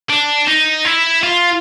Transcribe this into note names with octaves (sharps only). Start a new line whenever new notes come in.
D4
D#4
E4
F4